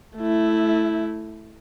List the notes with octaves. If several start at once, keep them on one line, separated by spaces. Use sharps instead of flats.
A3 E4